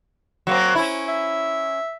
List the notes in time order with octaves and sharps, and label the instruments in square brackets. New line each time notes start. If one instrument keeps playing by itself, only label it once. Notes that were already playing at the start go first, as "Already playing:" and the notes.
[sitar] F#3 A#3 C4
C#4 E4
[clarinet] E5